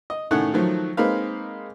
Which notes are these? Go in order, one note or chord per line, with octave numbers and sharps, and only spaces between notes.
D#5
A2 D#3 A3 C#4 F#5
D#3 F3 F#3 A3
G#3 A#3 C4 D#4 B4 F5